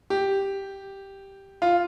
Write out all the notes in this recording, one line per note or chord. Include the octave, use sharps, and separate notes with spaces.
G4
F4